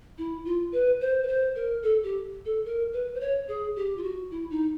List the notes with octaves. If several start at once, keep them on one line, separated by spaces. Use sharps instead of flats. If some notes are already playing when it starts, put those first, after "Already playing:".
E4
F4
B4
C5
B4
C5
A#4
A4
G4
A4
A#4
B4
C5
C#5
G#4
G4
F4
F#4
E4
D#4